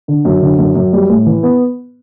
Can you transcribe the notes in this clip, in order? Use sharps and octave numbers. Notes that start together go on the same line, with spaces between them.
D3
F#2
D3
F#2
F#2
G3
A2
E3
B3